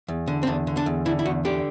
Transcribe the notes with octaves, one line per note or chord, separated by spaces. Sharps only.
E2
D3
C4
E2 D4
D3
D4
E2
D3 E4
E4
E2 F#4
D3 G4